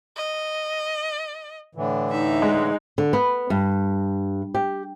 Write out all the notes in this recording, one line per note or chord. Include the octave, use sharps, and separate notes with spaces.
D#5
A2 D3 E3
D#4 E5
G#3
D3
B3
G2
G4